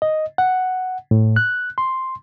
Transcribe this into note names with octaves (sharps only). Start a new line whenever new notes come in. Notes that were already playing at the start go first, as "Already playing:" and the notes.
D#5
F#5
A2
F#6
C6